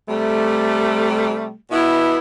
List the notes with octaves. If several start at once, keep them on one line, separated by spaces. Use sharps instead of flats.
C3 G3 A3
B2 B3 E4